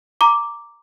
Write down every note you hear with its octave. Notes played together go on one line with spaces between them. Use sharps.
A#5 D6